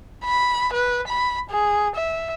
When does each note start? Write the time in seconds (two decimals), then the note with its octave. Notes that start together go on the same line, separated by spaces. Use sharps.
0.24 B5
0.73 B4
1.08 B5
1.50 G#4
1.96 E5